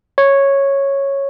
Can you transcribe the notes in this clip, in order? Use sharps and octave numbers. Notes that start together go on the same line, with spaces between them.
C#5